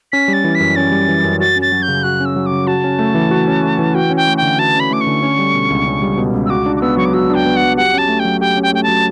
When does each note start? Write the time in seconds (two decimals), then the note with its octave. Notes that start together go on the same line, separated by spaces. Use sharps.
0.12 C#4 B6
0.28 G3
0.33 A6
0.44 E3
0.55 B6
0.60 F#2
0.76 C#4 A6
0.92 G3
1.09 E3
1.24 F#2
1.40 F#4 A6
1.56 C#4
1.62 A6
1.72 F#3
1.83 G6
1.88 C#3
2.03 F#4 F#6
2.20 C#4
2.25 E6
2.36 F#3
2.46 C#3 D6
2.67 F#4 A5
2.84 C#4
2.99 A3
3.15 E3
3.31 F#4
3.48 C#4
3.63 A3
3.79 E3
3.95 F#4 G5
4.10 C#4
4.16 G5
4.27 A3
4.37 G5
4.42 D3
4.58 F#4 A5
4.75 C#4 B5
4.91 A3 D6
5.01 C#6
5.07 D3
5.22 C#4
5.39 G3
5.54 B2
5.70 C#2
5.86 C#4
6.02 G3
6.17 B2
6.34 C#2
6.46 E6
6.50 F#4 D6
6.66 D4
6.76 D6
6.81 B3 E6
6.97 F#3 C#6
7.05 D6
7.14 F#4 E6
7.30 D4 G5
7.46 B3
7.56 F#5
7.62 F#3
7.77 G4 F#5
7.94 C#4 A5
8.09 A3
8.19 G5
8.25 F#3
8.41 G4 G5
8.57 C#4
8.63 G5
8.73 A3 G5
8.83 A5
8.88 F#3